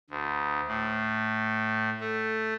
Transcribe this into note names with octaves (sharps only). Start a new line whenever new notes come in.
D2
A2
A3